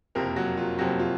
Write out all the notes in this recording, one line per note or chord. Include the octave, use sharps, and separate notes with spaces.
F#1 F2 C3 A#3 A#4
F#3 F#4
F4
F#1 F2 C3 F#3 F#4
F4